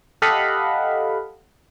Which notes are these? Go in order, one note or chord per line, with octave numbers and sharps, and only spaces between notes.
G4 A4 D#5 F5 F#5 B5